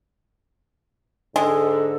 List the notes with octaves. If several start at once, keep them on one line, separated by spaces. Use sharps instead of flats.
G#2 D3 G#3 A4